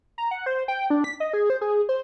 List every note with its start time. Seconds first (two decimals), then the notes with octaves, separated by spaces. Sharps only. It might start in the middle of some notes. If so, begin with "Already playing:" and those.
0.18 A#5
0.31 F#5
0.46 C5
0.68 G5
0.90 D4
1.04 B6
1.20 D#5
1.33 G#4
1.50 C5
1.61 G#4
1.89 C5